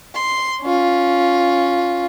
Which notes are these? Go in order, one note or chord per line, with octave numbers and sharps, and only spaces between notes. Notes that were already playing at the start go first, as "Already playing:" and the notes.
C6
C#4 F4